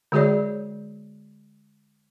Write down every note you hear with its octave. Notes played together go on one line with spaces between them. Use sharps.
D3 G#3 F#4 G#4 C#5 D5